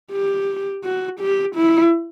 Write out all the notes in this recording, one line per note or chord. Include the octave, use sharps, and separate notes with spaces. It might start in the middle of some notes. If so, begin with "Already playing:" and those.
G4
F#4
G4
E4